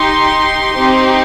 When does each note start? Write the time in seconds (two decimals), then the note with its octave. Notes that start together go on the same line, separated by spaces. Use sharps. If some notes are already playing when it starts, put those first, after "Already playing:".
Already playing: D#4 G4 C6
0.77 C4 D#4 G4